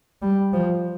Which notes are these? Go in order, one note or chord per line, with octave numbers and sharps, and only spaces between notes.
G3
F3